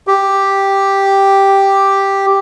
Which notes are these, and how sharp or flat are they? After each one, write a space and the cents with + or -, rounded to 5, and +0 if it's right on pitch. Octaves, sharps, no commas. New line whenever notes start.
G4 +0